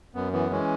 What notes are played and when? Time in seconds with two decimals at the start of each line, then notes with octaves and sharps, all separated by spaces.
0.14 F#2 B3
0.33 E3 B3
0.51 E3 G#3 C#4